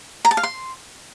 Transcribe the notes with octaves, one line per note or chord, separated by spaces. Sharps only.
A#5
A5
F5
C6